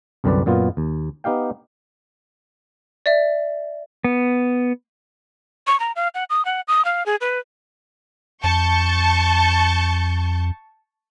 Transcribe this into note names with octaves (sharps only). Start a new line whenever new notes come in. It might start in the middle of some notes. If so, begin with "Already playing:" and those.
C2 F#2 D3 C4 B4 D5
F#2 A#2 B3 F4
D#2
B3 D#4 G4 F5 G5
D5 E5
B3
C#6
A#5
F5
F#5
D#6
F#5
D#6
F5
G#4
B4
F2 A5 C#6 G6